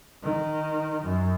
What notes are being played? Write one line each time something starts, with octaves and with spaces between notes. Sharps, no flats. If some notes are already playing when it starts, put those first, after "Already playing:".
D#3
F#2